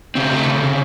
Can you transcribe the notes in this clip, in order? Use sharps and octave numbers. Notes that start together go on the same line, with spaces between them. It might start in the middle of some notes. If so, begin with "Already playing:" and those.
C#3 C4
A3
C#3
C#3